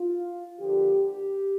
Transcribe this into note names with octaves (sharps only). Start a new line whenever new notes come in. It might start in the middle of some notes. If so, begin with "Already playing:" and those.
Already playing: F4
D3 F3 A#3 G4
G4